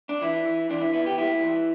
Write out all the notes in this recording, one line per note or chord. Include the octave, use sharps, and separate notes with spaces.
D4
E3 E4
E3
E3 D4
E4
B3 E4
G4
G2 E4
E3